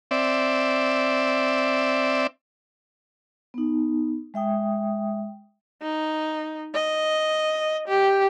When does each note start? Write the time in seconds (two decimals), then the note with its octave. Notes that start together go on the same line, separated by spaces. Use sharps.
0.11 C4 D5 E5
3.54 B3 D#4
4.34 G#3 E5 G5 D#6
5.82 D#4
6.74 D#5
7.88 G4